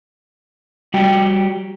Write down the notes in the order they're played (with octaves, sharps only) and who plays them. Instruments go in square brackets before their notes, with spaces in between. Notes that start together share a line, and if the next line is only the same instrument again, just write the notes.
[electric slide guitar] G3 F#4 G4 G5